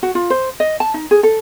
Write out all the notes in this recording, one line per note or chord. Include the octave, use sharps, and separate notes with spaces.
F#4
F4
C5
D#5
A5
D#4
G#4
A4